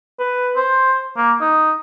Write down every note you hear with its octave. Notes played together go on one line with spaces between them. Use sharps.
B4
C5
A#3
D#4